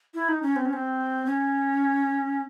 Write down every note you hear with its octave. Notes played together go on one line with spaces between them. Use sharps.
E4
D#4
C#4
C4
C#4
C4
C#4